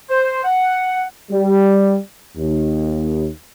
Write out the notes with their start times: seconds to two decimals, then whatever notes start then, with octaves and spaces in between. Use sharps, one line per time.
0.10 C5
0.45 F#5
1.31 G3
2.36 D#2